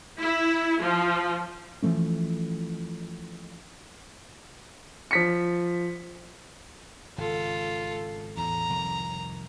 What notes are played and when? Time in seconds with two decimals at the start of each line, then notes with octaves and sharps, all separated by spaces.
0.19 E4
0.81 F3
1.82 E3 F3 A3 C#4
5.11 F3 B6 C#7
7.18 G#1 C#3 F4 A4
8.37 E2 A2 A#5
8.69 C2 F2 D#3